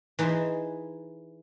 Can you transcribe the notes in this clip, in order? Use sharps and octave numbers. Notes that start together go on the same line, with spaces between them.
E3 D#4 G#4 C5 E5